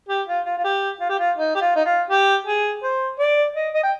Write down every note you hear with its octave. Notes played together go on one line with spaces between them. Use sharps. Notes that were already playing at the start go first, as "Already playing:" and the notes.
G4
F4
F4
F4
G4
F4
G4
F4
D#4
G4
F4
D#4
F4
G4
G#4
C5
D5
D#5
D#5
G5